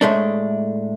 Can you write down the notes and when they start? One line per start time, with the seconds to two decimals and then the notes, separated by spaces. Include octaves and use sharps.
0.01 A2 G#3 A3 D4